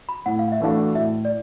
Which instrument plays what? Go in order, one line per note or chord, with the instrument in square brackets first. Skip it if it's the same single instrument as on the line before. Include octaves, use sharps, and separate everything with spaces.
[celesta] B5
[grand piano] A2 [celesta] F#5
[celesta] F5
E5
[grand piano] E3 A3 D4 F#4 [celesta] F5
[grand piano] A2 [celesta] E5
[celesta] D5